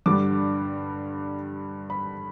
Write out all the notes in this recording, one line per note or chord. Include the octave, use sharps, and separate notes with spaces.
G2 D3 G3 D6
B5